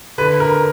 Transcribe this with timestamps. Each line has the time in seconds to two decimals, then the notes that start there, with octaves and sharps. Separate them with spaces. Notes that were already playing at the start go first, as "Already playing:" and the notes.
0.18 D3 B4
0.40 A#4